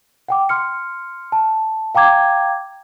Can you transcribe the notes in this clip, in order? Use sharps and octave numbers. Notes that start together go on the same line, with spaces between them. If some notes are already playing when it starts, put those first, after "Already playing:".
F#5 G5 D6
C6 F6 C#7
A5
F5 G5 A#5 D6 G#6